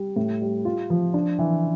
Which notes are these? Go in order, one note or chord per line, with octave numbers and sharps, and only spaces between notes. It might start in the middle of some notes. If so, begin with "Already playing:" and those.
Already playing: G3
A2
G3
F4
F3
D4
E3